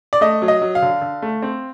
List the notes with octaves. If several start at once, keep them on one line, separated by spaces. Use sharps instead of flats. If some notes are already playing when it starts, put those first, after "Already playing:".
D5
A3 D#5
F#3
D#5
F#3
F5
D3
D3
A3
C4